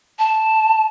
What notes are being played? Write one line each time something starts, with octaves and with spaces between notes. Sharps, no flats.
A5